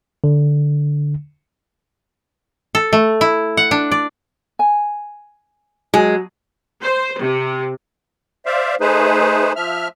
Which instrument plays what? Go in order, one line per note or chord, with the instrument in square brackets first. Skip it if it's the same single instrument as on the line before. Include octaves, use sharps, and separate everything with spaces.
[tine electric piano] D3
[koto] A4
A3
E4
F#5
D4
D5
[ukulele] G#5
[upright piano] F#3 [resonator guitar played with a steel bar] G#3
[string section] C5
C3
[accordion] C5 D5 E5 F5
A3 D#4 G#4 B4 C5
F3 E5 F6